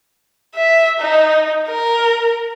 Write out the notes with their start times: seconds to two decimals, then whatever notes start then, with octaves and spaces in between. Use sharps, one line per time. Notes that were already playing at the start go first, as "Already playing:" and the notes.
0.55 E5
1.00 D#4
1.69 A#4